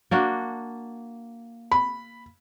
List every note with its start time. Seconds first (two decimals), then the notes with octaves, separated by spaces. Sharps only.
0.11 A#3 D4 F#4
1.72 B5